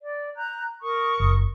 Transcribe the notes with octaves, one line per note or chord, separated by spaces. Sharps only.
D5
A#5 F#6 G6
A#4 C#6 D#6
F#1